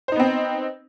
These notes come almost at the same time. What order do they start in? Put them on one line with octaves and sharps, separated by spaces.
C5 D#4 B3 C4